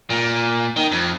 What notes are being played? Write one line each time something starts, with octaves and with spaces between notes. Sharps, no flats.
A#2
D#3
F2